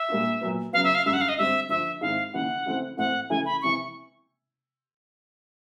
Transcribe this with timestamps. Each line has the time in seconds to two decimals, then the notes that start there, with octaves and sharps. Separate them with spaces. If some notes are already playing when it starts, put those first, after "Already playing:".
Already playing: E5
0.08 A#2 G3 A#3 D4 F4
0.41 A#2 F#3 B3
0.73 C#3 F#3 B3 F5
0.84 E5
0.95 F5
1.06 F#2 D3 G3 E5
1.13 F#5
1.21 F5
1.29 D#5
1.38 G2 D3 G3 C4 E5
1.69 G2 D3 F3 E5
2.01 G#2 D#3 G#3 C4 E4 F5
2.33 D#2 C#3 E3 F#5
2.66 C#3 E3 A3 C4
2.97 A2 E3 A3 C4 F#5
3.30 C#3 E3 A3 G#5
3.45 B5
3.62 C3 E3 C#6